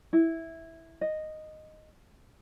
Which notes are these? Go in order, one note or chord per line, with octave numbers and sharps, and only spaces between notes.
E4
D#5